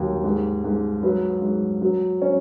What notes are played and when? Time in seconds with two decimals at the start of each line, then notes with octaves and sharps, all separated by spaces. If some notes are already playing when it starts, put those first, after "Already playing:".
Already playing: D#2 F#3
0.24 G#2
0.64 G#2
1.03 F#3 B4
1.42 G#2
1.82 F#3
2.22 C#4